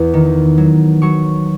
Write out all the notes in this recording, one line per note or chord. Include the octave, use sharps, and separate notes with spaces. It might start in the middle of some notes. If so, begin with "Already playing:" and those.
Already playing: E2
D#3
F#3
F#3 C#6